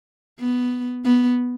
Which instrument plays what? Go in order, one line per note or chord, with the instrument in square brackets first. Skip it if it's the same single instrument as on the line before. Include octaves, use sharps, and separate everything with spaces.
[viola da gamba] B3
B3